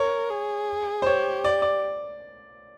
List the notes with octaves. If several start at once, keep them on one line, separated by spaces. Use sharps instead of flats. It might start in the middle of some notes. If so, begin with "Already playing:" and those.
Already playing: A#4 C#5
G#4
C5
G4 C#5
D5
D5